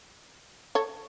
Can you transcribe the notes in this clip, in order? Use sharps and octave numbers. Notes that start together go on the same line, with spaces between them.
A4 C#5